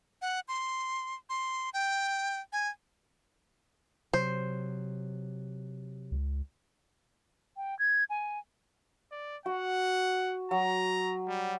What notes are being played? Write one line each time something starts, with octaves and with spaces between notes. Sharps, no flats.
F#5
C6
C6
G5
G#5
C3 F#3 C5
C#2
G5
G#6
G#5
D5
F#4 F#5
F#3 A#5
G3